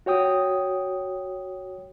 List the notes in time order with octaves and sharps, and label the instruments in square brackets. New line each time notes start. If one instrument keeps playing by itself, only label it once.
[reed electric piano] F#4 C#5 G5 D#6